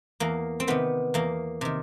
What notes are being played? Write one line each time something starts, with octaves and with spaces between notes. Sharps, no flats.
E2 A#3
C4
C3 D#3 B3
E2 A#3
C3 D#3